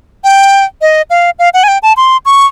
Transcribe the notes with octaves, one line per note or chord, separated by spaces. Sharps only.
G5
D#5
F5
F5
F#5
G#5
G5
A5
C6
C#6